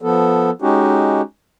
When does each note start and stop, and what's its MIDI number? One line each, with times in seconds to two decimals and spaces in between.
0.02 0.50 53
0.02 0.50 59
0.02 0.50 69
0.62 1.22 56
0.62 1.22 61
0.62 1.22 63
0.62 1.22 66
0.62 1.22 67